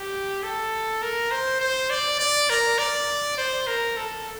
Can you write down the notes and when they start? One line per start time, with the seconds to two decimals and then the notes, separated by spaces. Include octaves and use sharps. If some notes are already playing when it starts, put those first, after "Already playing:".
Already playing: G4
0.43 A4
1.02 A#4
1.31 C5
1.61 C5
1.90 D5
2.19 D5
2.50 A#4
2.78 D5
3.38 C5
3.67 A#4
3.97 A4